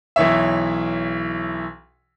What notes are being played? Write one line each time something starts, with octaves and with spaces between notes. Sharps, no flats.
B1 E3 C#5 E5